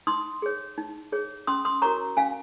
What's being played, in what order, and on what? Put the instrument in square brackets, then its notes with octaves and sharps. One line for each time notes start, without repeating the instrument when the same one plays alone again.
[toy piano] D#4 C6 D#6
G#4 C#5
D#4
G#4 C#5
C#4 C6 D#6
C6 D#6
F#4 A#4 C#5 A#5 C#6
C#4 F5 G#5